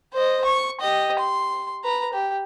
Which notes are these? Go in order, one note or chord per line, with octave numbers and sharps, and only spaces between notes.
C5 D#5
C#6
G4 D#5
C6
B4 A#5
G4